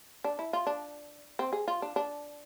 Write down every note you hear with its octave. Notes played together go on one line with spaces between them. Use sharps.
D4
E4
F4
D4
C4
G#4
F4
D4
D4